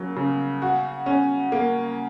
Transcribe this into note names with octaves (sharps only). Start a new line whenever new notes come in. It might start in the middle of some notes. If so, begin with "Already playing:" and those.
Already playing: C#3 F#3 A#3
C#3
F#4
C#4
A#3